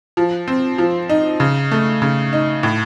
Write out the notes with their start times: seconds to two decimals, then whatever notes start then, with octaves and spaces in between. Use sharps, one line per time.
0.17 F3
0.48 C4
0.78 F3
1.09 D#4
1.40 C#3
1.72 A3
2.02 C#3
2.33 D#4
2.63 A2